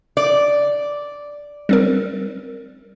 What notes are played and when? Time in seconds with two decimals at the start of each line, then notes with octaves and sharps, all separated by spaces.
0.17 D5
1.69 G3 C4 A#4